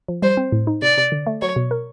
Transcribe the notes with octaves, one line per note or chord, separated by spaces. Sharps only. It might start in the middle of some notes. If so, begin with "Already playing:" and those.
F3
G3 C5
C4
A2
D#4
C3 D5
C3
D3
A3
F#3 C#5
B2
A#4